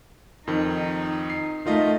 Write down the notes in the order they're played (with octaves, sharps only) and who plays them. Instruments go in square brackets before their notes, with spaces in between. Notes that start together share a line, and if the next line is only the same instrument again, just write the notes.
[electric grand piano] F2 D#3 [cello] D#4
[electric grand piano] C7
[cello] D#2 A3 [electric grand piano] D#3 F4 D#5